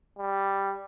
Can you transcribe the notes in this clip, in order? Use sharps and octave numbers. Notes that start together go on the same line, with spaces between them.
G3